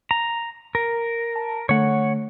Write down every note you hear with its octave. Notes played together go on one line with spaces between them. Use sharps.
A#5
A#4
A5
D3 A3 C#5 F#5